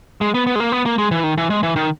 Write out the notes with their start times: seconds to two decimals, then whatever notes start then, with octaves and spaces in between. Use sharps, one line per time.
0.21 G#3
0.34 B3
0.47 B3
0.55 G#3
0.60 A#3
0.72 B3
0.86 A#3
0.98 G#3
1.11 E3
1.24 D#3
1.38 E3
1.50 G#3
1.63 E3
1.76 D#3